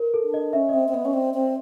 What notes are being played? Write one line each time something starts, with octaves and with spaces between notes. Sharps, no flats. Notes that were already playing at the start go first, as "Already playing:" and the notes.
Already playing: A#4 B4
A4
D4
D#5
C#4 E5
D#5
C4 E5
C4
B3 D#5
C#4
C4 D5
C4
C5